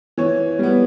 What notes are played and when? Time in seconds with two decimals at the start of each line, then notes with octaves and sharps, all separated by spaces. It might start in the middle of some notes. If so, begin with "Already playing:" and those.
0.18 E3 C#5
0.59 G3 B3